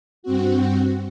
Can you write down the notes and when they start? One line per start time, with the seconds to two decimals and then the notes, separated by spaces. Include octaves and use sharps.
0.23 G2 C4 F#4